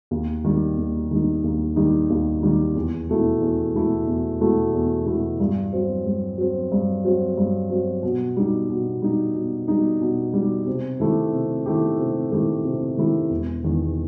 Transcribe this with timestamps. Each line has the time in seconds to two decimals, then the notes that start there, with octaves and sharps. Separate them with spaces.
0.11 D#2
0.44 D#3 G3 D#4
0.78 D#2
1.11 D#3 G3 D#4
1.44 D#2
1.76 D#3 G3 D#4
2.10 D#2
2.42 D#3 G3 D#4
2.75 E2
3.09 B2 A3 E4
3.41 E2
3.74 B2 A3 E4
4.07 E2
4.41 B2 A3 E4
4.74 E2
5.06 B2 A3 E4
5.40 G2
5.73 F#3 C4
6.06 G2
6.38 F#3 C4
6.72 G2
7.04 F#3 C4
7.38 G2
7.70 F#3 C4
8.03 B2
8.37 G3 D#4
8.69 B2
9.02 G3 D#4
9.35 B2
9.68 G3 D#4
10.01 B2
10.34 G3 D#4
10.67 C3
11.00 D#3 A3 E4 G4
11.33 C3
11.66 D#3 A3 E4 G4
11.99 C3
12.32 D#3 A3 E4 G4
12.64 C3
12.97 D#3 A3 E4 G4
13.30 E1
13.64 E2 D#3